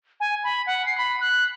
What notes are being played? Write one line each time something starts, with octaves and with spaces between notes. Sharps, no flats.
G#5
B5
F#5
C7
B5
F#6